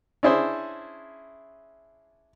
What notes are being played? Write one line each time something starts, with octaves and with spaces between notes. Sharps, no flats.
C#4 D4 E4 G#4 C5